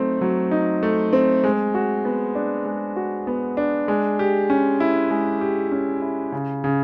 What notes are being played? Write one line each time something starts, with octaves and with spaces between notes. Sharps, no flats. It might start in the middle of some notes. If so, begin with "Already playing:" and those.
Already playing: F#3 A3 C4 D#4
F#3
D#4
A3
C4
G#3
F#4
B3
D4
G#3
F#4
B3
D4
G#3
G4
C#4
E4
G#3
G4
C#4
E4
C#3
C#3